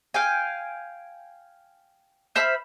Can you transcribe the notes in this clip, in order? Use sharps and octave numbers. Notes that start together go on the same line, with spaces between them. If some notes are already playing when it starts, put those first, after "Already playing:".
F5 G5 G#5
C5 E5 B5 F6